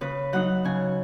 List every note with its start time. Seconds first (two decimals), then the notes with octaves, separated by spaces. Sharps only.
0.01 C#3 B4
0.33 F#3 D#4 F#5
0.65 C#3 G#5